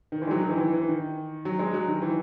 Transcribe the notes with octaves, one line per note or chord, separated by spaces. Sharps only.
D#3
E3
G#3
F#3
D#3
E3
E3
E3
D#3
F#3
G#3
F#3
D#3
E3